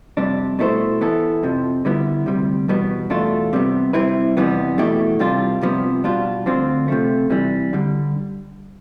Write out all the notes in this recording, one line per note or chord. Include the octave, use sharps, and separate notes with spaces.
F2 C3 G3 D4
B2 A3 E4 A4 C5
E3 B3 E4 A4
F2 C3 F3
D3 G3 B3 E4
D2 C3 G3
E2 B2 G3 B3
E2 B2 A3 D4 F4
C3 G3 B3
C3 G3 C4 E4 B4
F2 C3 E3 G3 B3
E2 B2 A3 E4 G4
C2 C3 G3 D4 F4
C2 C3 F3 B3
B2 G3 D4 F4
D2 D3 F3 C4 F4
C3 F3 A3
C3 E3 G3
D3 G3